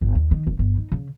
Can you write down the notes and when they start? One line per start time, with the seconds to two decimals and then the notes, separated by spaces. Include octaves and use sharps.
0.01 G1
0.15 D#2
0.31 D#3
0.47 F1
0.59 G1
0.77 D#4
0.92 C#3